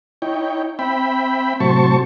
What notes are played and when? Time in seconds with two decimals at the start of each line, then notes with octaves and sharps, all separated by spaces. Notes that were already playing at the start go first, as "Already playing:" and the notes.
0.22 D#4 E4 C#5 G5
0.79 C4 E5 G5 B5
1.60 A2 C3 F#3 C5 A5 C#6